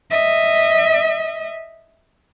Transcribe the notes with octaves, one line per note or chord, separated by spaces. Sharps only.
D#5 E5